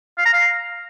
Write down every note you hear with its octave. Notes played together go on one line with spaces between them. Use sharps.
F5
A#5
F5